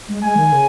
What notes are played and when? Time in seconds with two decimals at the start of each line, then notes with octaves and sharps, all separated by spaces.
0.08 G#3
0.23 G#3 G#5
0.37 D#3
0.52 C#3